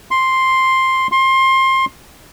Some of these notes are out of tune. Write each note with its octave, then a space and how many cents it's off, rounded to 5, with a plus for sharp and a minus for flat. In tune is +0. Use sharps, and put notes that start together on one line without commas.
C6 +5
C6 +25